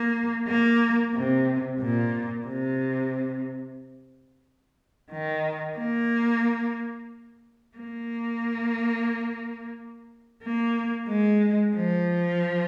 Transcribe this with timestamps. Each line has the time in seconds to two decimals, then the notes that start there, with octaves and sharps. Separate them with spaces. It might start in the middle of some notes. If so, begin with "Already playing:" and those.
Already playing: A#3
0.48 A#3
1.14 C3
1.80 A#2
2.47 C3
5.11 D#3
5.78 A#3
7.77 A#3
10.43 A#3
11.08 G#3
11.75 F3